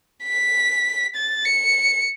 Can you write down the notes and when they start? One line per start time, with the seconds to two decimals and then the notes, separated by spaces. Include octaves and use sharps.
0.24 B6
1.15 A6
1.45 C#7